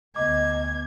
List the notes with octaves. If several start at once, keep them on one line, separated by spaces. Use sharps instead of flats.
D2 B3 D#5 D6 G#6